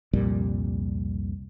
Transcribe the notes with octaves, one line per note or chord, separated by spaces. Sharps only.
C2 F2 A#2 G3